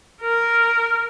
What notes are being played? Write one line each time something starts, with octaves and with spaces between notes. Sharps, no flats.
A#4